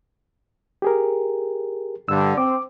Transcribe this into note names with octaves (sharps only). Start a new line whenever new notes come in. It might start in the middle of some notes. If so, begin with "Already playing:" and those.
G4 G#4 A#4
G2 D3 E6
C4 D6